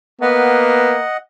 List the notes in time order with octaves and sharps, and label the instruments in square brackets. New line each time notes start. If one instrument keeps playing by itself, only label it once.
[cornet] A#3 [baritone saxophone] B3 [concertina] D#5 F#5